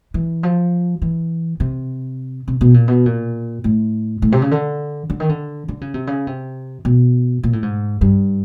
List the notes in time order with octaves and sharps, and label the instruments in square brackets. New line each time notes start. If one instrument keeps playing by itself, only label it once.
[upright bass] E3
F3
E3
C3
C3
B2
A#2
B2
A#2
A2
A2
C3
C#3
D3
D3
D#3
D3
D3
C#3
C3
C#3
C3
B2
A#2
A2
G#2
G2